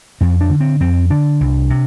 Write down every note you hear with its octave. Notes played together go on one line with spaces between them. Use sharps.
F2 C4
D4
D3
C4
F2 C4
D3 D4
C2
C3